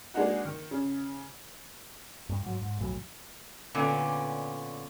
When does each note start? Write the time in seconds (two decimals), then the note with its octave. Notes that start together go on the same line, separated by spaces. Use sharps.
0.14 G#3 A#3 D4 D#4 F#4
0.45 D#3
0.71 C#3
2.29 G2
2.43 G#2 F#3
2.61 G#2
2.79 B1 F2 A2 F#3
3.75 A#2 D3 B3 C#4